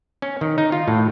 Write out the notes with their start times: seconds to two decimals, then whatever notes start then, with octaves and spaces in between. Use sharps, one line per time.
0.22 C#4
0.41 D#3
0.58 D#4
0.72 F4
0.88 A2